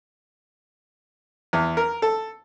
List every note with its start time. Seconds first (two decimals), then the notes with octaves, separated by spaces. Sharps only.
1.53 E2
1.77 A#4
2.02 A4